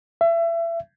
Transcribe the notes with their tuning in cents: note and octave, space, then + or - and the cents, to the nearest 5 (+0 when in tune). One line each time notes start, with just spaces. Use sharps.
E5 +30